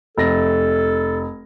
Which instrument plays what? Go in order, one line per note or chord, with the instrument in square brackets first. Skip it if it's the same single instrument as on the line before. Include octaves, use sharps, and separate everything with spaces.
[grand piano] F1 A#6 [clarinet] A4